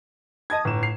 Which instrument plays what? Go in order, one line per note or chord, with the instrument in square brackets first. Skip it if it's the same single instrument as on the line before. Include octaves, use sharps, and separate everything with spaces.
[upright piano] D#5 A5 G#6 [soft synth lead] D#6
[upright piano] G1 E7 [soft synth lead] A2
[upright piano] C7 F7